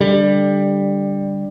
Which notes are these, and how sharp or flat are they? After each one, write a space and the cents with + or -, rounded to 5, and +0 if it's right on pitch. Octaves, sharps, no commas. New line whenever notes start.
D3 +0 G3 +15